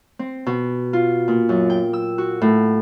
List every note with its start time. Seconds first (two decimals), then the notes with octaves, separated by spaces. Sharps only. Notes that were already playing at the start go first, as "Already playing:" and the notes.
0.19 C4
0.46 B2
0.93 F4
1.28 A#2
1.49 F#2
1.70 G5
1.93 E6
2.18 F#4
2.42 A2